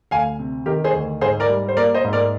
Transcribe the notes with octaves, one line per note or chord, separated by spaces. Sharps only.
D2 F5 G#5
C3
D#3 G4 A#4
G#4 C5
D2
G#2 G#4 C5
A#4 D5
G3
C5
A#3 A#4 D5
C5 D#5
G#2
A#4 D5